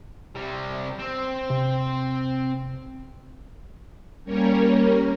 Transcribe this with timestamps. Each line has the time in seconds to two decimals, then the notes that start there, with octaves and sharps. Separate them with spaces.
0.35 C3 G3
0.99 C4
1.50 C3
4.24 G3 A#3 C#4 A#4 C#5